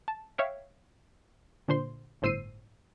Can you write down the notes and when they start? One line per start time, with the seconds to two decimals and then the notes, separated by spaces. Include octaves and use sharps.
0.08 A5
0.38 C#5 E5 F5 G5
1.68 A#2 D3 C5 C6
2.22 G1 A2 C5 E6 C7 D#7